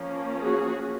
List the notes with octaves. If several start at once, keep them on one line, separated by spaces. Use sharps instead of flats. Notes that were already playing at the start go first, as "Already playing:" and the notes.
Already playing: F3 A#3 C#4
F#4 G#4